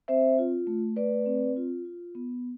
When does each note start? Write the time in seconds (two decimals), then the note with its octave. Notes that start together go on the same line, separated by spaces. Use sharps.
0.08 C4 C5 E5
0.39 F4
0.67 A3
0.96 A3 B4 D5
1.26 C4
1.56 F4
1.85 F4
2.15 B3